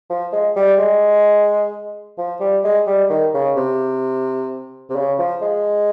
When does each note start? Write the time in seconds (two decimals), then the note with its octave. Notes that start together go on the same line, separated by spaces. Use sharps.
0.10 F3
0.33 G#3
0.56 G3
0.78 G#3
2.18 F3
2.40 G3
2.64 G#3
2.87 G3
3.10 D#3
3.34 C#3
3.56 C3
4.90 C3
4.96 C#3
5.19 F3
5.42 G#3